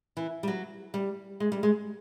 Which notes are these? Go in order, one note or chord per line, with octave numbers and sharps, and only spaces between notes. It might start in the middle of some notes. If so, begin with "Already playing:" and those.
E3
G3
F#3
G3
G#3
G3
G#3